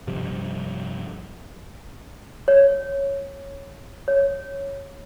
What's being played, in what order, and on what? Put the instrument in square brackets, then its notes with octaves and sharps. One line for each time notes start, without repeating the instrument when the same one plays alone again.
[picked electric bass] G2 C3 F3 G3
[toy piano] C#5
C#5